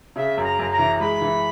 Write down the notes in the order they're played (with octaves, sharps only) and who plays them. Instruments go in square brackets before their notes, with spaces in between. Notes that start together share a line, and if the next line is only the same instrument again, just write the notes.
[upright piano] C#3 [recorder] E5
[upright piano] F#2
[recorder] A#5
[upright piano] F#2
[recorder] A#5
[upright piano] E3
[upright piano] G#3 [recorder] B5
[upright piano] E3